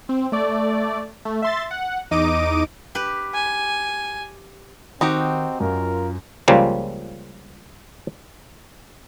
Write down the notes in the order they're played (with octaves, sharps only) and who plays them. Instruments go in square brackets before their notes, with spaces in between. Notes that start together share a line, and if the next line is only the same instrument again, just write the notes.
[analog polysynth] C4
A3 D5
A3
E5 C6 A6
F#5
E2 D#4 D#5 D6 D7 D#7
[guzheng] G4 B4
[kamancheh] G#5
[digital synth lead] D#3 [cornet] C4 [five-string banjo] D#4 F#4 G4
[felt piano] F#2 [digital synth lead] F4 [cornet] A#4
[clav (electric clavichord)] C#2 C#3 F3 G3 A#3